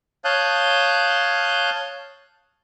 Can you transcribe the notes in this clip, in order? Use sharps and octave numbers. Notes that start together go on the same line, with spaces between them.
C#5 F5 A5 D#6 F#6 G6